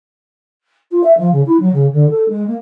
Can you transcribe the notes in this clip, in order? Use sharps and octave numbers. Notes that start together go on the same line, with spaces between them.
F4
E5
F3
C#3
E4
F#3
C#3
D3
A4
G#3
A#3